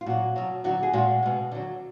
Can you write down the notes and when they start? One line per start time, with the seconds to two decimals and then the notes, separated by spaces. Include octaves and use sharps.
0.01 F4
0.06 A#2 F#3 F#4
0.36 B2 F#3
0.64 D3 F#3 F#4
0.83 G#4
0.93 A#2 G#3 F#4
1.23 B2 G#3
1.52 D3 F#3